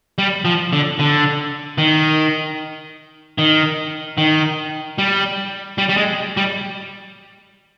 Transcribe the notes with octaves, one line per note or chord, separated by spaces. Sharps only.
G3
F3
D3
D3
D#3
D#3
D#3
G3
G3
G3
G#3
G3